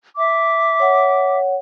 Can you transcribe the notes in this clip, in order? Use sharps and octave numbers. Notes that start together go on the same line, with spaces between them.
E5 D6
C#5 F#5